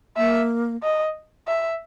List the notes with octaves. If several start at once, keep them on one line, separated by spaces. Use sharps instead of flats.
A#3 E5
D#5
E5